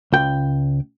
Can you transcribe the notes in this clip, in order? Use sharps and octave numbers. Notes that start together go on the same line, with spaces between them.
C#2 G5